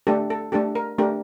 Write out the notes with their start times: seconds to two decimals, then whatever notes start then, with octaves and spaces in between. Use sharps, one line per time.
0.07 A3 D4 G4 A4
0.30 A4
0.52 A3 D4 G4 A4
0.75 A#4
0.98 A3 D4 G4 A#4